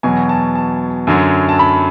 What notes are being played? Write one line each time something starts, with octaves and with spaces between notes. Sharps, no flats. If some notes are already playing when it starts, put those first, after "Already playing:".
E2 B2 F#3 G#5
A5
A5
F#2 D3 F#3
A5
B5